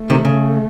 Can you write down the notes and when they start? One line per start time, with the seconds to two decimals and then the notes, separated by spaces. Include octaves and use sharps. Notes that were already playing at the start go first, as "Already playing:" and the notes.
Already playing: A3
0.10 C3 D#3
0.25 C#3